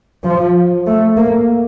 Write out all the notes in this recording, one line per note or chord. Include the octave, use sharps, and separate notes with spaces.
F3
A3
A#3